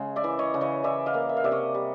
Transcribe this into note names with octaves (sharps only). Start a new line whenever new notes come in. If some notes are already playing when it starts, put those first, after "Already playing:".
Already playing: C#3 G#3
D5 E5
E3
C#5 D#5
C#3
C#5 D#5
E3 D5 E5
D#5 F5
A#3
E5
F5
C3 D5 E5
C#5 D#5
G3